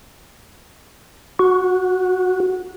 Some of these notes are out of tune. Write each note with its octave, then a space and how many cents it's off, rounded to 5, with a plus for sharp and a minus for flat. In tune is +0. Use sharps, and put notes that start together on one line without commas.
F#4 -5